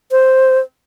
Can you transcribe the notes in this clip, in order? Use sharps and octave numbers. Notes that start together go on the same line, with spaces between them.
C5